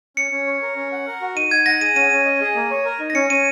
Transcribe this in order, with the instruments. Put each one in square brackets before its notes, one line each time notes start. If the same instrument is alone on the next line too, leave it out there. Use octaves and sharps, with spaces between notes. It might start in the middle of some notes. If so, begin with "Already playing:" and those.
[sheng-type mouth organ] C#4 [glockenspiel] C#7
[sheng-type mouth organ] C#4
C#5
A#4
C#4
F#5
A#4
F#4
[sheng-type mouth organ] D#4 [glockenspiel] D#7
[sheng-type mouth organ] D#4 [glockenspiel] G#6
[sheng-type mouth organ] F#5 [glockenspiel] A#6
[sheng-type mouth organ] G#4 [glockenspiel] D#7
[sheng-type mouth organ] C#4 [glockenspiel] D#7
[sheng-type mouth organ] C#4
D#5
G#4
A#3
C#5
A#4
D#4
[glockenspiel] A#6
[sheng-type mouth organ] C#4 [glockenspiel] C#7
[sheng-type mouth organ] C#4 [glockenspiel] D#7